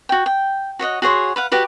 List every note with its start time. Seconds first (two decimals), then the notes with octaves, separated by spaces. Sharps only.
0.09 F#4 G5
0.26 G5
0.79 F#4 C#5 D#5 F#5
1.02 F#4 G#4 C#5 C6
1.36 B4 F5 F#5
1.52 F#4 G4 B4